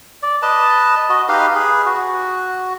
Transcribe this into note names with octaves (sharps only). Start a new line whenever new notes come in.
D5
B4 D#5 A5
F#4 D#5
D#4 G4 B4 F5
G#4 B4
F#4